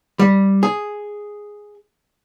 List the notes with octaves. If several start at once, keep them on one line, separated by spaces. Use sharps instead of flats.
G3
G#4